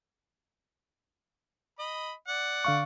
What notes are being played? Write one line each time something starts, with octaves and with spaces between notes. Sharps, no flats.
D#5 B5
D5 F#5
D3 F5 C#6